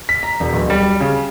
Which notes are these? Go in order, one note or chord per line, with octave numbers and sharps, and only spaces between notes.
B6
A#5
E1
D1
G3
C#3